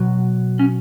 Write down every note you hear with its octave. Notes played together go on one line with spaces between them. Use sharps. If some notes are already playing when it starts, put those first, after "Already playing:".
Already playing: B2 F#3
C#4